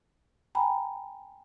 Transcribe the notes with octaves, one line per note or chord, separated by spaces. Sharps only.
G5 G#5 A#5 B5